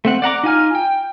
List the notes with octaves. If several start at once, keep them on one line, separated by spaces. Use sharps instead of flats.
A3 C4 F#5
D5 F#5 A#5 D6
D#4 F4 G#5 F6
G5